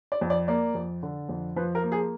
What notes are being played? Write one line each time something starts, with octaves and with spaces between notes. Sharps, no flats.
D5
F2
D5
A#3 D5
F2
D3
F2
F3 B4
A#4
A#3
G#4